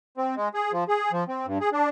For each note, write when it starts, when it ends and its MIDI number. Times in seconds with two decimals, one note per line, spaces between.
0.17 0.35 60
0.36 0.49 56
0.54 0.72 68
0.73 0.84 53
0.88 1.11 68
1.12 1.24 53
1.28 1.46 60
1.46 1.58 43
1.61 1.70 68
1.73 1.89 62